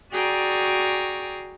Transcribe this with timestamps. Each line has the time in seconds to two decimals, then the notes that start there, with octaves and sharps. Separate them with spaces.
0.12 F#4 G#4 D5 G5 A#5 C#6